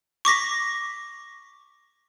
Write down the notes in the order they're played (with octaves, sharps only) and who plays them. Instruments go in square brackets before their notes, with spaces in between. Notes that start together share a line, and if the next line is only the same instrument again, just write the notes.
[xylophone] C#6 D6 A#6 B6